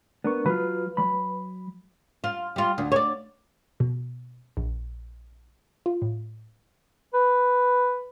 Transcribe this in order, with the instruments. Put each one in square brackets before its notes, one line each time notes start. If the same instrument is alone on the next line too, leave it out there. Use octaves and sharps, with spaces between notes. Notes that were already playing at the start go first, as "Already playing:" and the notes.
[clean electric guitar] B3 [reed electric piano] D4 A#4 C#6
[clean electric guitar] F#3 F4 [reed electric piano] B4
[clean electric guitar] F#3 B5
[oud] F4
G3 F4
D2
C#5 D5
[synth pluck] B2
A#1
F4
A2
[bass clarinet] B4